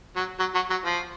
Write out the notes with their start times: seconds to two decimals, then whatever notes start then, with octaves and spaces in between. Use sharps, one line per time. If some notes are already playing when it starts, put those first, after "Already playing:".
0.16 F#3
0.40 F#3
0.55 F#3
0.70 F#3
0.85 F3